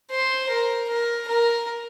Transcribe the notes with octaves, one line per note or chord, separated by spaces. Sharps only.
C5
A#4
A#4
A#4